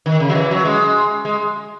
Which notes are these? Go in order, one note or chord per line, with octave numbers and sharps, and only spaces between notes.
D#3
C#3
F#3
E3
F#3
G#3
G#3